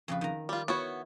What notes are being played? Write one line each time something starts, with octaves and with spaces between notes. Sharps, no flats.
F2 C#3 B4
D#3 A#5
G3 F4
B3 E4 F#4 C#5